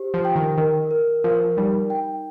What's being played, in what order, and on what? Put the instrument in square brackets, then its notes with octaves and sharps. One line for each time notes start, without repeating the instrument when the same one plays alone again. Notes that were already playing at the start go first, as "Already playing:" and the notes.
Already playing: [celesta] G4 C5
[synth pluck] F3
[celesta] G5
[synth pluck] D#3
[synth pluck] D#3 [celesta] A#4
[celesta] A#4
[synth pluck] F3 [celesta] A#4
[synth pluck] G3 [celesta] D#4
[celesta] G5